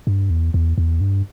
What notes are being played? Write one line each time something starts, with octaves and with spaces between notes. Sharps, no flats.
G2
E2
E2
E2
G2